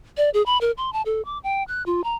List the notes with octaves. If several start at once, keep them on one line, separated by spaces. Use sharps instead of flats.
D5
G#4
B5
A#4
C6
A5
A4
D6
G5
F#6
F4
A#5